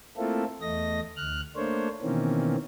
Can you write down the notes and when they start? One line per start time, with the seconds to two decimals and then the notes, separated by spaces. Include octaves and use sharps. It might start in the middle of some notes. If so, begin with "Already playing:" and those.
0.17 A3 A#3 C4 E4 F4 A4
0.61 E2 A3 D#5 A#6
1.17 D2 F6 F#6
1.56 A3 A#3 D4 C5 C#5
2.02 B2 D#3 E3 A#3 C4 C#4